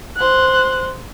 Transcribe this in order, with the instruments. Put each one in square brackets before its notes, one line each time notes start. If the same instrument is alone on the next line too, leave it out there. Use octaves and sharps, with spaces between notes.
[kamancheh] C5 F#6